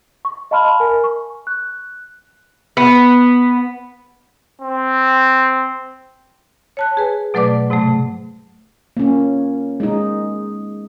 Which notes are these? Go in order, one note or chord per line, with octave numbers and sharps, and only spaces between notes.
C#6
D#5 F5 A5 B5 C6 F6
A#4 G#5
C#6
F#6
B3
C4
C#5 A5 F#6
G#4 B4 G#5
B2 F#3 A3 B4 D5 D6
G#2 C3 F#3 A3
A#3 C#4
G#3 D#4